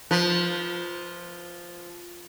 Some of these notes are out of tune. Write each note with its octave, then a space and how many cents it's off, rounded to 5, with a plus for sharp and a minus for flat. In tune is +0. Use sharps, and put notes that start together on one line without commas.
F3 +0 B4 -30